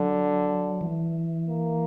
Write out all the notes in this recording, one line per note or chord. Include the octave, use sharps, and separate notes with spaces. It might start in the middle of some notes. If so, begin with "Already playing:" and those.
Already playing: D3 F#3
E3
A#3